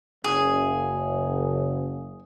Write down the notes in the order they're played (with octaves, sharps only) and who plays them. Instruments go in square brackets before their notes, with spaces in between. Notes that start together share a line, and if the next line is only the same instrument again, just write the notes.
[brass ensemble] F#1 [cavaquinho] G#4